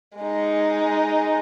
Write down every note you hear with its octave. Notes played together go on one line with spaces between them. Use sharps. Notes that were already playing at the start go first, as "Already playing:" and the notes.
G#3 D#4